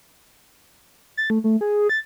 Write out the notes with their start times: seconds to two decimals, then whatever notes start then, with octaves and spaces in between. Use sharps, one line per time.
1.17 A6
1.30 A3
1.44 A3
1.61 G#4
1.89 A6